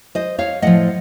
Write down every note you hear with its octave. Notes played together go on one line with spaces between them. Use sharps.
C5 D#5
C#5 F5
A2 F3 D#5 F#5